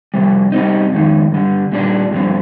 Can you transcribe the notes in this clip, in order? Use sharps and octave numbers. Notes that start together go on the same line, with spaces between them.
F2 C3 G3
C3 G3 C4 D#4
F2 D#3 G#3 D#4
G2 D3 G3
A#2 G3 D4
G2 D3 F3 C4